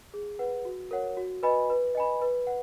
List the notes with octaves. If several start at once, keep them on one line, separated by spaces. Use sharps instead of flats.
G#4
B4 F#5
F#4
A#4 C#5 F#5
F#4
B4 D#5 G#5 B5
B4
D#5 G#5 B5
B4
F#5